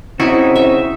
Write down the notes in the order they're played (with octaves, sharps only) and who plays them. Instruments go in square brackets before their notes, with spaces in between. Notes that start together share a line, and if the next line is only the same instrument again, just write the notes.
[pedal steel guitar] C#3 D#4 F#4 [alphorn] C4 [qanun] E4
[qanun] E5